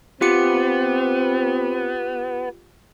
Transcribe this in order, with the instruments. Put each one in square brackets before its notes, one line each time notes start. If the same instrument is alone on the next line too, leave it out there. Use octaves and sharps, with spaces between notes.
[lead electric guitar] B3 [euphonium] C4 [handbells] F4 G4 C#7